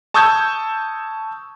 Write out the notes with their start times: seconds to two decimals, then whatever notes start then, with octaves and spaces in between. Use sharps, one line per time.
0.14 A5 C#6 D#6 E6 G6 G#6